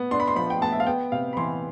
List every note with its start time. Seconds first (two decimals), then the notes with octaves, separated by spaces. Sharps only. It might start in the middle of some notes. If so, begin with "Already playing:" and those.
Already playing: B3
0.11 D4 C6
0.20 B5
0.28 C6
0.36 F3 B5
0.50 G5
0.62 B3 A5
0.72 E5
0.80 F5
0.87 B3 G5
1.12 C3 F5
1.33 B5
1.37 E3 C6